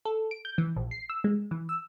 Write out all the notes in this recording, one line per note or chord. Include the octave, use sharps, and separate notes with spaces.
A4
D7
G6
E3
A#1
C7
E6
G#3
E3
E6